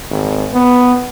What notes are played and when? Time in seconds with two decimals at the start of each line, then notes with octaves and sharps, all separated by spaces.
0.11 G#1
0.54 B3